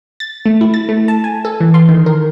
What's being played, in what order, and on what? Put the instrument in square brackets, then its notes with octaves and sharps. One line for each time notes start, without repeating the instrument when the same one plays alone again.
[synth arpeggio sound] A6
A3
E4
A6
A3
A5
G#5
A4
E3
C6
D#3
A#4